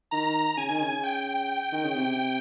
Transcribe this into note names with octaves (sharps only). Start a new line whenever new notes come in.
D#3 A#5
C#3 G#5
D#3
C#3
G5
D#3
C#3
C3